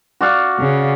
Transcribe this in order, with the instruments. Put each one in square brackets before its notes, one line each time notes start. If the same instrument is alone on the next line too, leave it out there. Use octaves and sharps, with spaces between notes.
[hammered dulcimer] F#4 D5 F5
[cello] C#3